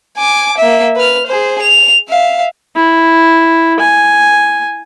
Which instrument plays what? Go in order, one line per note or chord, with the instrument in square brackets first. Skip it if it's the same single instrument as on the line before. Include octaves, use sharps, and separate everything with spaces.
[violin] G#5 D6
A#3 E5
B4 F6
G#4 C5
F7
E5 F5
[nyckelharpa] E4
G#5